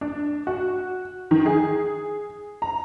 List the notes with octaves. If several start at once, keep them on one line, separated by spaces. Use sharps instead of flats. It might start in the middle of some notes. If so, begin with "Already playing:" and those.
D4
F#4
D#3
G#4
A#5